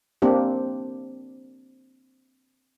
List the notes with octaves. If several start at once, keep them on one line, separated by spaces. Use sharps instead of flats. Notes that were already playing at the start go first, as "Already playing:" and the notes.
A#3 C4 D4 G4